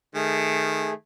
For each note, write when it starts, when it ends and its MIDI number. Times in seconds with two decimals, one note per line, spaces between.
0.15 0.91 51
0.15 0.93 57
0.15 0.93 68